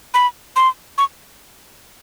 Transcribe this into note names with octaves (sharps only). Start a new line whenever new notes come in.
B5
C6
C#6